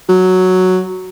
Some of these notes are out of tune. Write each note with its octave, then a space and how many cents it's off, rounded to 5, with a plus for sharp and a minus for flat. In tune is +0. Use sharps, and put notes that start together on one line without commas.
F#3 +0